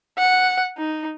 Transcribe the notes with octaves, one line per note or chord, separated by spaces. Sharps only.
F#5
D#4